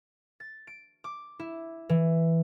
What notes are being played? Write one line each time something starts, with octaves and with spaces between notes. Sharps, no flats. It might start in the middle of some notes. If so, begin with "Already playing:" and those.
A6
D7
D6
E4
E3